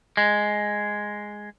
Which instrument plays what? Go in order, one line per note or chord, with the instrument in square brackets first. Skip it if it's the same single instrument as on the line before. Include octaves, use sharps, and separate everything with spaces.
[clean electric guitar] G#3